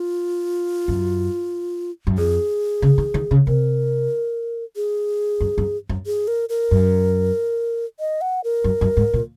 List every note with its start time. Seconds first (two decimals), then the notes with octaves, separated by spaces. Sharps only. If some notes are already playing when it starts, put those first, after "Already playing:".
Already playing: F4
0.88 F#2
2.07 F#2
2.17 F2 G#4
2.82 C#3
2.98 D#3
3.14 D#3
3.31 C#3
3.47 C3 A#4
4.76 G#4
5.41 F#2
5.58 F#2
5.89 F#2
6.06 G#4
6.28 A#4
6.49 A#4
6.71 F#2
8.00 D#5
8.21 F#5
8.44 A#4
8.64 F#2
8.81 F#2
8.97 G#2
9.14 A#2